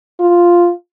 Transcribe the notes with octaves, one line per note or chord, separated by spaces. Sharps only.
F4